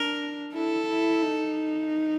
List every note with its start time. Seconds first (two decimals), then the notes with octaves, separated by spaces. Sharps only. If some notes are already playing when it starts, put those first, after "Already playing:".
Already playing: D4 A#4
0.54 E4 A4
0.89 E4
1.23 D#4